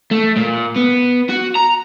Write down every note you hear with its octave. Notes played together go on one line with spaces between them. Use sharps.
A3
A#2
B3
F#4
A#5